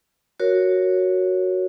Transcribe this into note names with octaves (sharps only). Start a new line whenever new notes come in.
F#4 A#4 C#5